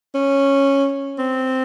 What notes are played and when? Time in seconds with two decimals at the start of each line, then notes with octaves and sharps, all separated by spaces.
0.15 C#4
1.19 C4